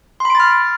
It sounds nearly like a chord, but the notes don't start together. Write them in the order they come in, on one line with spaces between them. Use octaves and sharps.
C6 B5 D7 A6 F6